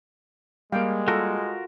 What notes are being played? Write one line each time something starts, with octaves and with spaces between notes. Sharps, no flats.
G3 G#3 A#3 F5 G5
F4 F#4 A4 A#4